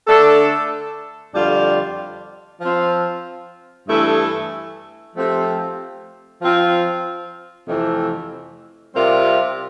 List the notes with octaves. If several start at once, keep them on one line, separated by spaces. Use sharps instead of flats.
D3 A3 D4 A4
F2 D3 G3 D4 F4
F3 C4 F4
G2 E3 A3 E4 A4
F3 A3 C4 G4
F3 C4 F4
F2 C3 E3 A3 C4
C3 G3 C4 F4 A#4